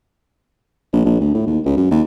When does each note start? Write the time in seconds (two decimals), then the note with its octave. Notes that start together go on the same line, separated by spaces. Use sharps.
0.93 A#1
1.05 A#1
1.21 D2
1.34 A2
1.47 D#2
1.65 C#2
1.77 F#2
1.91 D#2